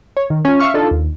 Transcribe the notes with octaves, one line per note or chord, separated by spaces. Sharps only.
C#5
D#3
C#4 F4
E5 F5 C#6 F6
D4 D#4 F4 A4
D#2